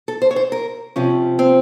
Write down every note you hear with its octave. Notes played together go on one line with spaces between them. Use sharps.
A4
C5
C#5
C5
A#4
C3 F3 C#4
C4